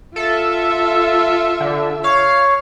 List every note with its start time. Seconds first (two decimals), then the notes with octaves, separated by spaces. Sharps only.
0.16 F4 A4 E5
1.60 D3
2.04 C#5 F5